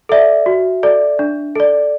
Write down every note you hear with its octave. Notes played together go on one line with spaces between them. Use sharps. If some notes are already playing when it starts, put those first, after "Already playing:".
A4 D5 E5
F#4
A4 D5
D4
A4 D5